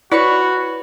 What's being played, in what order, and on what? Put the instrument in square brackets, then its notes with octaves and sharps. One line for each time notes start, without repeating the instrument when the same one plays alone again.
[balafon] E4 D5 [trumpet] F#4 [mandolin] B4 C#5 C#6